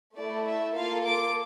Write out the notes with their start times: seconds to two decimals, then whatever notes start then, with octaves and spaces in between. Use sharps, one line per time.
0.17 A3 E4 A4 D5
0.46 E5
0.76 A#3 F4 A4 F5
1.05 D6